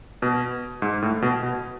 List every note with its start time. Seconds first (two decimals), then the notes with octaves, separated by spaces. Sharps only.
0.22 B2
0.82 G#2
1.02 A2
1.22 B2
1.43 B2